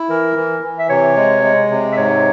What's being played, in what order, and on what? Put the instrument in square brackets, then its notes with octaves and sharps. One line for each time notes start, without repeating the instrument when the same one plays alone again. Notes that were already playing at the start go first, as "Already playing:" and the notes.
Already playing: [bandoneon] E4
[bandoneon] E3 [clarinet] A#4
[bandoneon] E3
E3
[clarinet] E5
[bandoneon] C3 [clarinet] C#5
[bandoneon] G#3
G#3
C3
[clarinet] E5
[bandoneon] G#2 [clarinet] C#5